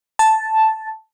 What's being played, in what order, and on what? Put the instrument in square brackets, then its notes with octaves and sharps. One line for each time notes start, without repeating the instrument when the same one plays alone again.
[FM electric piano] A5